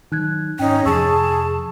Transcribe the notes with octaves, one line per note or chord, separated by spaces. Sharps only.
D#3 E3 F#3 D#4 F#6 G#6
G#2 C#4 D#4 G5
F2 C3 F3 G#4 A5 C#6 E6